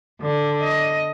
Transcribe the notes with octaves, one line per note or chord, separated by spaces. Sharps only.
D3
D#5